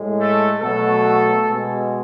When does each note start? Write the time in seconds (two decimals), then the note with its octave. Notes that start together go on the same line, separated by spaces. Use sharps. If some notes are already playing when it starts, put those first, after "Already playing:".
Already playing: A2 G#3
0.18 A3 A4
0.61 B2 F#3 A3 A4
1.47 B2 G#3